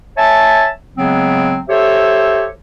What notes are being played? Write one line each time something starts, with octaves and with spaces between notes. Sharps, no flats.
C#5 E5 G#5 A5
C#3 F#3 G#3 B3 C4
G4 A4 C5 C#5 E5